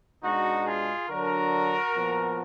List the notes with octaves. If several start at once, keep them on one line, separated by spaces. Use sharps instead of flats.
B2 G#3 D4 D#4 F#4
F4 G#4
D3 F#3 D4 F#4 A#4
A#2 F3 B3